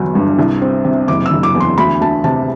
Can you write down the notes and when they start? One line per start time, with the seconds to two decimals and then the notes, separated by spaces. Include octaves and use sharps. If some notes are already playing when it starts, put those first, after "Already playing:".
Already playing: G1 E2 F#3
0.15 G2
0.39 C2
0.62 C4
0.85 C3
1.08 F#1 D6
1.26 E6
1.31 F#1
1.43 D6
1.55 E2
1.60 C6
1.78 D2 B5
2.01 D2 A5
2.24 C3 A5